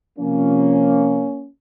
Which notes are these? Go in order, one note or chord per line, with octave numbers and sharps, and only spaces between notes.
C3 F3 A#3 C#4